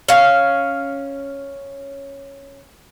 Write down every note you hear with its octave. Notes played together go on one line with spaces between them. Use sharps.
C#4 F5